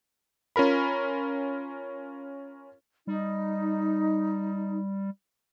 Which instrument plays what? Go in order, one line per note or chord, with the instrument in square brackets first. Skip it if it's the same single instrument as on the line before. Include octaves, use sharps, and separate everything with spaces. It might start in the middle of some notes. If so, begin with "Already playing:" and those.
[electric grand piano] C#4 F4 A#4 B5
[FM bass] G3 [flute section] D#4